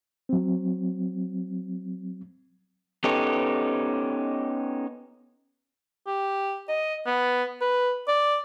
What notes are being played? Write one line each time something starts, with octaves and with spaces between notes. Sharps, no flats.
F#3 C4
B3 C#4 D#4 G4 A4
G4
D#5
B3
B4
D5